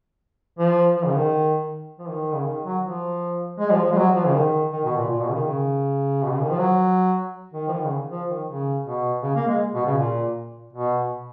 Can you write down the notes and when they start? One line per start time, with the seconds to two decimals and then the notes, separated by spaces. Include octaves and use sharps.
0.59 F3
0.96 F3
1.05 C#3
1.15 D#3
1.99 F3
2.09 D#3
2.35 C#3
2.46 D#3
2.65 F#3
2.84 F3
3.59 G#3
3.71 F3
3.84 F3
3.92 G#3
3.97 F#3
4.15 F3
4.26 C#3
4.34 D#3
4.72 D#3
4.85 B2
4.97 A#2
5.10 A#2
5.21 B2
5.29 C#3
5.34 D#3
5.47 C#3
6.23 B2
6.32 C#3
6.42 D#3
6.50 F3
6.59 F#3
7.54 D#3
7.68 F3
7.73 D#3
7.85 C#3
8.10 F3
8.29 D#3
8.48 C#3
8.86 B2
9.23 C#3
9.36 A#3
9.48 G#3
9.75 B2
9.86 C#3
9.98 A#2
10.73 B2